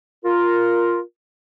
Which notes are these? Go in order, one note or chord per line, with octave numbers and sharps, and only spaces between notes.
F4 A#4